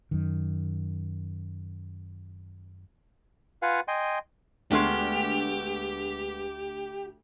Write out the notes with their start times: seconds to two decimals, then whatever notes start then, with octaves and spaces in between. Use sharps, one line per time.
0.11 F#2 D#3
3.62 F4 B4 F5 F#5 G#5
3.88 D#5 G5 G#5 C6
4.72 D2 G#3 A3 B3 D4 G4 F6